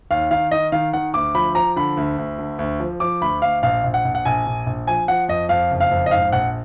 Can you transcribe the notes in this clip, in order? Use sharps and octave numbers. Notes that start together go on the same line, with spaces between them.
D#2 F5
D#3 F5
D#3 D#5
D#3 F5
D#3 F#5
D2 D6
F3 B5
F3 A#5
D3 B5
D2
D2
D3
D2
F3
F3 D6
D2 B5
D2 F5
A#1 F5
A#1
F#5
A#1
F#5
A#1 G#5
A#1
A#1
F3 G#5
F3 F#5
F2 D#5
F2 F5
F#1
F5
F2
D#5
G#2 F5
A#1 F#5